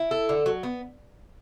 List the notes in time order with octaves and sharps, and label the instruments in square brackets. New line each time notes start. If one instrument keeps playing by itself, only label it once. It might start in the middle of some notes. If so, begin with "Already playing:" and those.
Already playing: [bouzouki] E4
A4
D3
F#3
B3